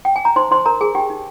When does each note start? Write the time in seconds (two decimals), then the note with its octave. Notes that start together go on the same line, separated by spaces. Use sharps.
0.05 G5
0.16 G#5
0.25 A#5
0.36 D#4 C5 C6
0.51 D#4 C5 C6
0.66 A#4 A#5
0.81 G#4 A#4 G#5
0.95 D#4 G4 G5
1.10 D#4